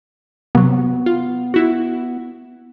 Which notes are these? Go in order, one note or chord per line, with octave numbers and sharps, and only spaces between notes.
C3 F#3 B3
F4
E4 F#4